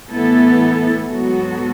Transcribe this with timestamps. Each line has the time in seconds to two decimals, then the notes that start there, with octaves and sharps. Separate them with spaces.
0.11 A2 E3 B3 E4 A4
1.11 G#2 F#3 B3 F#4 A4